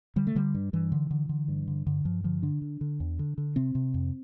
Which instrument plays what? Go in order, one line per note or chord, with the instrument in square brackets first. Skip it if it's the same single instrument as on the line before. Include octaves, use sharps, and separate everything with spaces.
[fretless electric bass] D3 G3
A3
D3 G3
G2
G2 E3
D3
D3
D3
G2
D3
G2 D3
G2 F3
D3 F3
D3 D4
D3
D3
E2
D3
D3
C3 C4
C3
F2